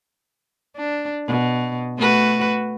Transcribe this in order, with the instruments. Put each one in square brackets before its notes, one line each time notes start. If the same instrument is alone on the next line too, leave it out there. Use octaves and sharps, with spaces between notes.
[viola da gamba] D4
B2
A3 F#4 B4